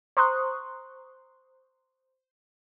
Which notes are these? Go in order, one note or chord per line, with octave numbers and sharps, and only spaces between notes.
C5 A#5 C6 C#6 D#6 F#6